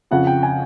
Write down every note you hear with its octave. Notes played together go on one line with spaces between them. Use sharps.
F2 C#3 F3 F#5
G5
G#5